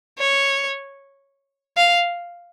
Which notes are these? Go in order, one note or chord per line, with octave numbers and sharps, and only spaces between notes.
C#5
F5